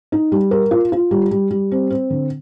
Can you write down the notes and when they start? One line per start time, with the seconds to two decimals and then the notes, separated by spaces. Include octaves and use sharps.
0.12 D#4
0.32 G3
0.51 A#4
0.71 F4
0.92 F4
1.11 G3
1.31 G3
1.51 G3
1.71 C4
1.90 C4
2.10 D3